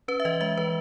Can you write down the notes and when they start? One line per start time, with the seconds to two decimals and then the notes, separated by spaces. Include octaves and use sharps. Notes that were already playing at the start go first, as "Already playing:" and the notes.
0.08 C#4 B4
0.20 E5
0.25 E3 D#5
0.41 G#3 E5
0.57 E3 B4